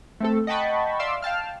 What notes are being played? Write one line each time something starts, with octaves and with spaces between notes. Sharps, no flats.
A3 C4 A4
D#5 F#5 G5 A5 B5 C#6
D5 E5 F5 C6 D6 E6
F5 G5 A5 F6